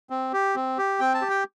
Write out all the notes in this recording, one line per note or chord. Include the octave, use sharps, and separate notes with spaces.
C4
G4
C4
G4
C4 G5
A5
G4
G5